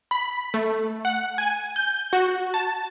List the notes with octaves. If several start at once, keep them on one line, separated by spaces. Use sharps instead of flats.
B5
A3
F#5
G#5
G6
F#4
A5